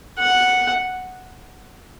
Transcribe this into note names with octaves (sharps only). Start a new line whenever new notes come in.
F#5